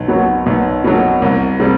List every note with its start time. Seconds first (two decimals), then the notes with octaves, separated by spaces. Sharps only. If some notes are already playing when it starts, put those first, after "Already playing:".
Already playing: B1
0.08 B2 F#3
0.46 B1
0.84 B2 F#3
1.22 C2
1.60 C3 G3